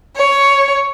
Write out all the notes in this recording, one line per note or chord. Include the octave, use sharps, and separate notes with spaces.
C#5